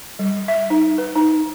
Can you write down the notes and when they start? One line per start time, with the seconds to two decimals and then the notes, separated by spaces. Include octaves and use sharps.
0.19 G3
0.48 E5
0.70 D#4
0.98 B4
1.16 D#4